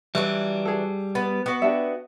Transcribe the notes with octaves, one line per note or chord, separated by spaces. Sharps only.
E3 F#3 G3 D4
G#4 A4
B3 B4
B3 F#4
D4 G4 E5